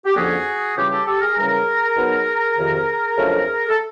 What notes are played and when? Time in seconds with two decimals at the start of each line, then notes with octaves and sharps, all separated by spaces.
0.06 G4
0.16 F2 D3 F3 A#3 C#4 F#4 G#4
0.75 C#3 E3 G3 F4 G4
0.90 G4 A4
1.06 G4 A4
1.20 G#4 A#4
1.36 F#2 C#3 E3 G3 G#4 A#4
1.96 B2 F#3 B3 D#4
2.56 F2 C3 D#3
3.16 F2 C#3 F#3 A3 D4
3.69 A4